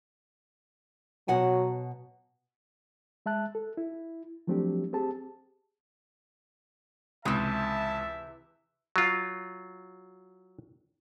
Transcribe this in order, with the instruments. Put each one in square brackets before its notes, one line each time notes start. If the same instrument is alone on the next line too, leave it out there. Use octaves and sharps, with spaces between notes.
[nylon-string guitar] B2 F#5 G#5 [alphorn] F#3
[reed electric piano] G#3 E5 A5 F#6
A4
E4
F3 F#3 A3 C4 D4 G4
C4 G4 G#4 A5
[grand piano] C#2 D#6 E7 [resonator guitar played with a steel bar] C3 E3 [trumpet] E5 [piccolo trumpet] A5
[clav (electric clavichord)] F#3 F4